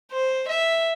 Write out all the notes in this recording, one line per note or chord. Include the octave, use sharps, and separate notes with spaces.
C5
E5